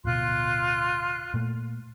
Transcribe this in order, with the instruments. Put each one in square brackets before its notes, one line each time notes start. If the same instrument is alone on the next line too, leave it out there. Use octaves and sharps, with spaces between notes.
[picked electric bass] D1 B2 [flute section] F4 C6 F#6
[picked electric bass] A#2 A3